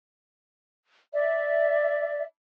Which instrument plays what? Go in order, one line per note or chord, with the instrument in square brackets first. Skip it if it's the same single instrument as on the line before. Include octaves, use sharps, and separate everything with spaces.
[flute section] D5 E5